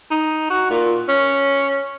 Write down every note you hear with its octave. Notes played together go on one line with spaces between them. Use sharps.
D#4
F#4
A#2
C#4